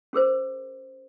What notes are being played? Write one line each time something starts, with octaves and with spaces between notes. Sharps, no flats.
C#4 G#4 A#4 C5